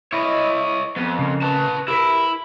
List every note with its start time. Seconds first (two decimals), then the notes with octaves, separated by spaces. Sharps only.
0.13 E4 C#5 D#5
0.97 F2 B3
1.19 C#3 A#3
1.43 B4 A5
1.88 E4 G4 A#4 B4